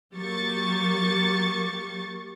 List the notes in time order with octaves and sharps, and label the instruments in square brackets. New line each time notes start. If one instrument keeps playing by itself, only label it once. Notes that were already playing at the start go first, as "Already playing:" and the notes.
[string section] F#3 A#3 G4 C#6 A6